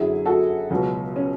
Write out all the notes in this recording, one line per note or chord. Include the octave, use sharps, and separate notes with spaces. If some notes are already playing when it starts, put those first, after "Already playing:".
Already playing: F#2 D3 F#3 E4 G#4
F#4 A4
C#2 B2 F#3
C#4